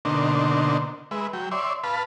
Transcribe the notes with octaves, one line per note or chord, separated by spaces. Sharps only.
B2 D3 A#3 D4 D#4 C5
G#3 B4 E5
F#3 G5
C#5 D5 E5 C6
B4 F5 A5 B5